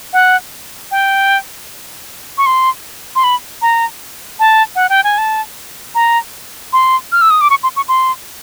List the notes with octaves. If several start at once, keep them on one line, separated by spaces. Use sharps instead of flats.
F#5
G5
C#6
C6
C6
B5
A#5
A5
F#5
G5
G#5
A5
A#5
C6
F6
E6
D#6
D6
C#6
C6
C#6
C6